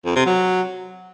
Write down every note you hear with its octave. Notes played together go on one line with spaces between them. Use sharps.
F2
C3
F#3